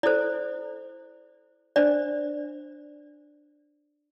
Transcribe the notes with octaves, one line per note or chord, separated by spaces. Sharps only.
E4 A4 C5 D5
D4 C5 D5